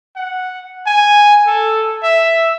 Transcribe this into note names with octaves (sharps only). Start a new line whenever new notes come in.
F#5
G#5
A4
E5